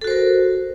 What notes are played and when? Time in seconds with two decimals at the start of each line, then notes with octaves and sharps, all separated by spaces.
0.01 A4
0.04 F#4
0.07 C5
0.10 A#4